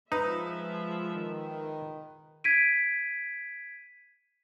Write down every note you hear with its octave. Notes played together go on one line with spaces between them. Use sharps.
F3 G#3 D#4 B4 E5
D#3
G#6 B6 D7 D#7